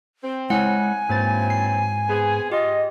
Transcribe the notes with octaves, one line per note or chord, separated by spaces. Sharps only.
C4
G#3 E4 C#5 F#5 G#5 F#6
G#2 E3 F#3 A#3 C4 C5 A6
C7
B3 C4 G#4
F4 G4 D#5